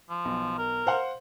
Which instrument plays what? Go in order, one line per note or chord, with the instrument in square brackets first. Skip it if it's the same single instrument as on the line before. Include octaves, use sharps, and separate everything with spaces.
[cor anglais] F3
[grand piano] B1
[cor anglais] A#4
[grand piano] C5 F5 F#5